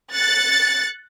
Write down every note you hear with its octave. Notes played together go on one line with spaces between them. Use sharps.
F#6 A6 C#7